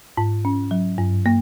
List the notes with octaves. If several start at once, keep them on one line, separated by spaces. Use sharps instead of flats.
G#2
C#4
F#3
G2
A#3